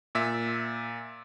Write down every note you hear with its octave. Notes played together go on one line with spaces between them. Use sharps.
A#2 E5